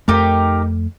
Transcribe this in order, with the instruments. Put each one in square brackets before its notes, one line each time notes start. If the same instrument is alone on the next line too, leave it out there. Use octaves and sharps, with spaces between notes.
[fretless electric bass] F2 A3 [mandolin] D#4 G4 A#4